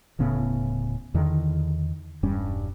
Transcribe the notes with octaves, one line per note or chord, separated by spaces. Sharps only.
D1 A2 C#3 B3
E2 D3 D#3
E1 G2 G3 C#4